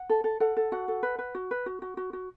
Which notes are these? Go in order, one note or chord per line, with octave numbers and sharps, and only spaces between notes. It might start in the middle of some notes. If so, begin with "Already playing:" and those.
Already playing: F#5
A4
A4
A4 F#5
A4
F#4 F#5
A4
B4
B4
F#4
B4
F#4
F#4
F#4
F#4